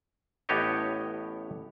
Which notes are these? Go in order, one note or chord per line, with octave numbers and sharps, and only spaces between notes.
A1 A2 B3 G4 C#5 D#5